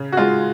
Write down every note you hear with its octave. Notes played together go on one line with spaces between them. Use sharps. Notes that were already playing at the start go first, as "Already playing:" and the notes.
Already playing: C#3
F#4
G#3 F4